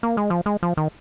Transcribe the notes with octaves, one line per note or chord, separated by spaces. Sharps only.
A#3
G#3
F3
G#3
F3
D#3